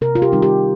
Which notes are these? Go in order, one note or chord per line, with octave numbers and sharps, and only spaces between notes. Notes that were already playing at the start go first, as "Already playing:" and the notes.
C3 A#4
F4
G4
D#3 G3 C4 D#4
G4